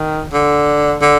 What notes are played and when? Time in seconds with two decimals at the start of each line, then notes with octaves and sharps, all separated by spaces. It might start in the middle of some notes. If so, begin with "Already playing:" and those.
Already playing: D#3
0.33 D3
1.02 D3